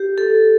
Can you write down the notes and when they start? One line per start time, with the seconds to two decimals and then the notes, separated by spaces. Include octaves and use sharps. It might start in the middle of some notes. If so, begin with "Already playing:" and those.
Already playing: G4
0.18 A4